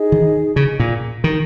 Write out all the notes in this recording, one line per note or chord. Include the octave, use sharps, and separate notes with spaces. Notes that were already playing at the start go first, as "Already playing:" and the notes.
Already playing: D#4 G#4 D#5
D#3
C#3
A#2
D#3